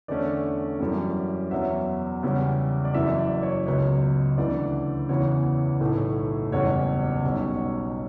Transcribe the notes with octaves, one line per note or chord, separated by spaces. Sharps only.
E2 D3 A3 C#4 D5
F#2 E3 G3 C#4
E2 B2 F#3 C#4 E5
E2 C#3 G3 C#4
D5
F#1 F#2 E3 E5
D5
C#5
C#2 B2 F#3 B3 C#5
D2 C#3 E3 D5
E2 C#3 E3 B3 C#5
B1 A2 E3 A3
F#1 E2 B2 G3 C#4 C#5
B1 B2 G3 C#4